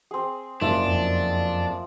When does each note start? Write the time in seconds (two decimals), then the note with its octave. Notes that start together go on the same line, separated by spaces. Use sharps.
0.11 C4 G#4
0.61 F#1 F3 D4 E5
0.88 F2